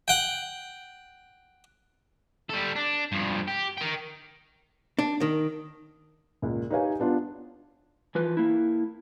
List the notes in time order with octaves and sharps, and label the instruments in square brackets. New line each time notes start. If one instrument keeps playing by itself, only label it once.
[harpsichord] F#5 G5
[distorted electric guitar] G3 A4
D4
G2 F3
G4
A#4 G5
[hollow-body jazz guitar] D4
D#3
[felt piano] C#2 A#2
D#4 G4 B4 C#5 F5 G#5
B3 D4 F4
[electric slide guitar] E3 F3 B4
A#3 E4